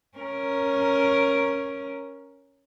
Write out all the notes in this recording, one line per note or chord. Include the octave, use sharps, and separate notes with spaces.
C#4 A#4